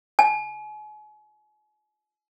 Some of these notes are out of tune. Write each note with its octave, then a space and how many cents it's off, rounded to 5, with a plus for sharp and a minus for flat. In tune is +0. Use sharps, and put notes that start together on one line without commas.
G#5 +35